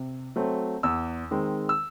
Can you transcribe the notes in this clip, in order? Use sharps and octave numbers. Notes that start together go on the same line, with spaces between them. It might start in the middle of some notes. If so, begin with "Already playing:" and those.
Already playing: C3
F#3 A3 C4
E2 E6
D#3 G#3 C4
E6